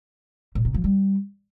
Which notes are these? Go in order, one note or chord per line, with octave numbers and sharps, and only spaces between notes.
A#2
C3
F3
G3